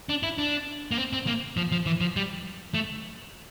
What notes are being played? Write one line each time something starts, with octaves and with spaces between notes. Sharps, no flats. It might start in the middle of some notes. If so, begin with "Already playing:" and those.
D4
E4
D4
A#3
C4
C4
A#3
F3
F3
E3
F3
G3
A3